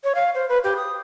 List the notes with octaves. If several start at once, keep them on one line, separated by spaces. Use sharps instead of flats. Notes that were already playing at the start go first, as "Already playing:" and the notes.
C#5
F5
C5
B4
G4
D#6